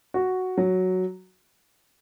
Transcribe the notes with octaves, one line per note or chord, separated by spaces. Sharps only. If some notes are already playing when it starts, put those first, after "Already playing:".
F#4
F#3